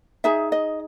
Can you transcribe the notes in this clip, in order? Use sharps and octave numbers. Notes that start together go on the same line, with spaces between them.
D#4 G#4 E5
D#5